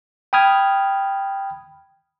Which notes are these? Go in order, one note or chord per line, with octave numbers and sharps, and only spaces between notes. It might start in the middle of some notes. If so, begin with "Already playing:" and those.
G5 B5 D#6 F6 G#6